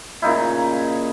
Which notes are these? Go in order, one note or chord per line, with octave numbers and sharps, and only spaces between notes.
A#2 C#3 D#4 E4